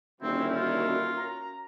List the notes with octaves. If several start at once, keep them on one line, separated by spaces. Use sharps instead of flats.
D#1 D3 C4 C#4 D#4 E4 F#4 A#4
F4
A#5